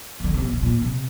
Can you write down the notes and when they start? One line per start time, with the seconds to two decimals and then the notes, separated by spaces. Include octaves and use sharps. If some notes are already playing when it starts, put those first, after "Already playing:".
0.20 D#3
0.24 D3
0.34 C3
0.44 A#2
0.53 C3
0.63 A#2
0.81 C3